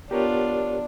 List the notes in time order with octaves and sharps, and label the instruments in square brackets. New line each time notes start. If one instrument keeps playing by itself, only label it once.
[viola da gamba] B3 F4 [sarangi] D4 [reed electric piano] G4 A#4 C#5